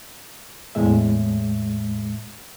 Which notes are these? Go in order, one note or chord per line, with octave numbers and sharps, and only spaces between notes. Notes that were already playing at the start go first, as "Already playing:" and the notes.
E2 A2 G#3 E5